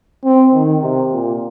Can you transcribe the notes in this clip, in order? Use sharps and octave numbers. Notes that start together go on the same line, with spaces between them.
C4
D#3
C3
A#2